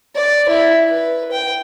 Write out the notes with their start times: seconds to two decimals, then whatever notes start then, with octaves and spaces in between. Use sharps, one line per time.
0.15 D5
0.49 E4
0.89 B4
1.31 G5